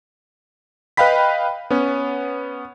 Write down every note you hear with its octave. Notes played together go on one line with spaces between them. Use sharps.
B4 D#5 F5 G5 B5 B6
B3 C#4